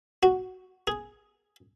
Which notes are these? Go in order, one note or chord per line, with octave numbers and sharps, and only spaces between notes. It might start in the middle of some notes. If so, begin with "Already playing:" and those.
F#4
G#4